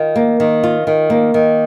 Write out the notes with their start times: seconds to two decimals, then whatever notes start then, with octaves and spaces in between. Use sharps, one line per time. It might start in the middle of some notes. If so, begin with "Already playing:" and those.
Already playing: D#3 F4
0.16 A#3
0.40 D#3
0.63 F4
0.87 D#3
1.10 A#3
1.34 D#3